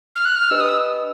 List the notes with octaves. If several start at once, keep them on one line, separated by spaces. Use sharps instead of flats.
F6
F#6
F6
D4 G4 B4 D#5 E6
D#6
E6